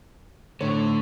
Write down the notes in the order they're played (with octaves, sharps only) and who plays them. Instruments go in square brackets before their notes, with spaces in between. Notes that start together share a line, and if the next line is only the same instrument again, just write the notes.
[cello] A2 [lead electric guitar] D3 [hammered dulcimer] C#5